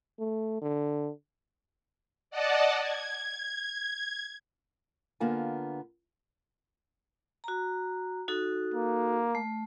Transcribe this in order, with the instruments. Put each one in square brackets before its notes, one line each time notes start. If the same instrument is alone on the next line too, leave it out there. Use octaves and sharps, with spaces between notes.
[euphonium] A3
D3
[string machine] D5 D#5 F#5 A5
G#6
[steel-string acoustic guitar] D3 A#3 B3 F4 G#5
[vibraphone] F#4 A#5
D#4 F#4 A4
[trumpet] A#3
[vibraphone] A3